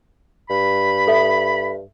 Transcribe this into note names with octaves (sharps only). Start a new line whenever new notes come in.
G2 B5
A4 E5